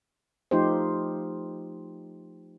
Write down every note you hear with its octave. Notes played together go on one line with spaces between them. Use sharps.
F3 A3 D#4 F4 G4 C5